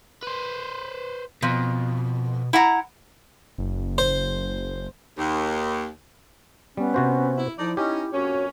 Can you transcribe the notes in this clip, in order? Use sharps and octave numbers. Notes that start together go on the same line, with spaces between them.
B4 C5
F2 B2
E4 F#5 A#5
F#1
C5
D#2
G3 B3 C#4
C3 F#4 C5
E4
F3 D#4 E4 A4 D5
C#4 D#4 G4 D#5
F2 A#3 C#4 F#4 C#5